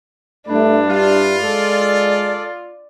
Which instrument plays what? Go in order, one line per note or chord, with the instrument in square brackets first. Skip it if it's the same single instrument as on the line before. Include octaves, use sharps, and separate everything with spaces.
[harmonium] G2 E4 [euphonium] A3 [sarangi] D4
[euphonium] G3 [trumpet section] F4
[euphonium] G#3 [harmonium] A4 [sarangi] D5